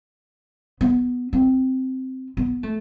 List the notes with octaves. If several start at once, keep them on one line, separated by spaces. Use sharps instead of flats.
B3
C4
B3
A3